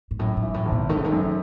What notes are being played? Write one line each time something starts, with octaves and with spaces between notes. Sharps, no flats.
G#2
F#2 A2
G#2
E3
A2
G#1
B2
D#3 A3
C#3
D#3
F#2
D#3